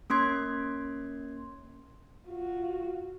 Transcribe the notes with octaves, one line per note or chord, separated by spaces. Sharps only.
A#3 C#4 C6 G#6
F4 F#4